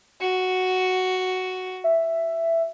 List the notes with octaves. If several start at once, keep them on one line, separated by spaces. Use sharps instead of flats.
F#4
E5